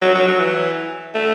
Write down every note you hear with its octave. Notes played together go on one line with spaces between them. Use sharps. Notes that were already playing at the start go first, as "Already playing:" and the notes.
F#3
F#3
F#3
E3
A3